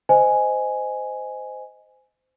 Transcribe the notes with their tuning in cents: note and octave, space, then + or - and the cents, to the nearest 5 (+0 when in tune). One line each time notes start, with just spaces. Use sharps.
C5 -20 D#5 +0 G#5 +0